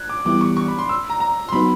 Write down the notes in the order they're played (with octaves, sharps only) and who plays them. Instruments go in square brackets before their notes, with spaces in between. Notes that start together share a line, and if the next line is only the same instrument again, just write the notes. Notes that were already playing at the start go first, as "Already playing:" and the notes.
Already playing: [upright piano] F#6 G#6
D6
[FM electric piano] E3 G3 B3 E4 G4 [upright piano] D6
[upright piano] C#6
C#6
B5
C6
E6
A#5
A#5
C6
[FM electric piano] F#3 B3 D#4 F#4 B4 [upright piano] B5